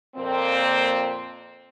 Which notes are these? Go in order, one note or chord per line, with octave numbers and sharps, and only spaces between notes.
F2 A#2 A#3 C4